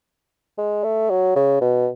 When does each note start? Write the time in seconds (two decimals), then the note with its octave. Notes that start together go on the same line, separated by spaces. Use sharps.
0.58 G#3
0.84 A3
1.10 F#3
1.36 C#3
1.61 B2